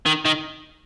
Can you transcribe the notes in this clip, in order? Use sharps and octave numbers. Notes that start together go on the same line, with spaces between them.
D#3
D#3